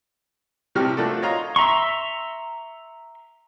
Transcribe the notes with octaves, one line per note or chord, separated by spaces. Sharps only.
A2 C3 G3 G4 C#6 F6
F3 A3 A#3 D4 F#4 A4
C#5 D#5 F5 A#5 C6
E5 A#5 C6 C#6